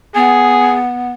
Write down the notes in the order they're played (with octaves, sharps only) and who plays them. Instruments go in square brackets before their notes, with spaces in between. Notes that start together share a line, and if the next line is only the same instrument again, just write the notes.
[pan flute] B3 [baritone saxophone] G#4